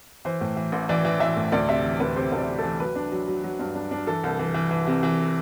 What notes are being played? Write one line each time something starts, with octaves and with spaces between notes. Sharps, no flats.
E3 C5
A2
E3
A1
E3 D5
E3
E3 E5
A2
D2 D5
C3 E5
E3
D2 B4
C3 C5
D2
D5
C3
E3 A4
F#3 B4
D4
F#3
F#3
F#3
G2
D4
D4
E3 A4
C2
E3
E3
E3
C3
E3